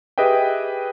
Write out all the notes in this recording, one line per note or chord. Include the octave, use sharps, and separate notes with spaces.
G4 G#4 B4 D#5 E5 G5